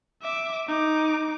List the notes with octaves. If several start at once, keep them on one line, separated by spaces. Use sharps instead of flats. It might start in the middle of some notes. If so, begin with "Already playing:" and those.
E5 D6
D#4 D6